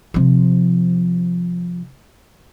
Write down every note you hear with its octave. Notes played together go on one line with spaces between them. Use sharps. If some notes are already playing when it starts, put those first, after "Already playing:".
C3 F3